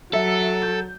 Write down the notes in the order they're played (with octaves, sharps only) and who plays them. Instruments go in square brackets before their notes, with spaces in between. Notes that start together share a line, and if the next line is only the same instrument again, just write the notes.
[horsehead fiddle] F#3 [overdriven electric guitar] A4 [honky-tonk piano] E5
[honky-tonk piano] G6